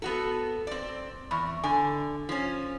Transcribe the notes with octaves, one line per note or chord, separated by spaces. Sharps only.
B3 F#4 A4
C4 D5
E2 B5 C#6
D3 G#5
F3 C#4